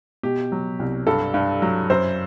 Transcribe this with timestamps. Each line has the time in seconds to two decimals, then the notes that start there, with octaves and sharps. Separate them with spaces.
0.23 B2 G4
0.52 F#3
0.79 C2
1.07 G2 A4
1.34 G2
1.62 F#3
1.90 F#2 C5